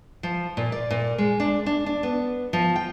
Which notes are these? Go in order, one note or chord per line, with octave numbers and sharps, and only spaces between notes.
F3
A#2
D5
A#2
G#3
D4
D4
D4
B3
F3
G5